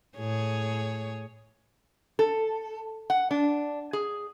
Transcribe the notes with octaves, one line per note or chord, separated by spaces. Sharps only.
A2 G#4 C#5
A4
F#5
D4
G#4